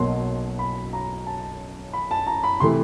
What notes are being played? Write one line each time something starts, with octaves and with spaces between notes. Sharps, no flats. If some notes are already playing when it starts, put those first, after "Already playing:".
Already playing: B1 B2 F#3 A#3 C6
B5
A#5
A5
B5
A5
A#5
B5
C3 E3 A3 C6